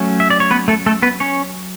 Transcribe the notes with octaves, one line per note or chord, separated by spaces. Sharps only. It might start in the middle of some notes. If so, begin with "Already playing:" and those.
Already playing: F#3 A3 C#4
E5
D5
C#5
B3 B4
A3 A4
A3 A4
B3 B4
C#4 C#5